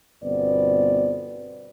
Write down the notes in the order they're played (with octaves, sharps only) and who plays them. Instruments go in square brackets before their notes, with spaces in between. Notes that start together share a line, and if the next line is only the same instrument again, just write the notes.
[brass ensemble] G1 B2 B3 C4 D5